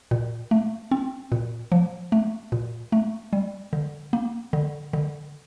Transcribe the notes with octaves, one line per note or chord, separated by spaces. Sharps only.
A#2
A3
C4
A#2
F3
A3
A#2
A3
G3
D3
A#3
D3
D3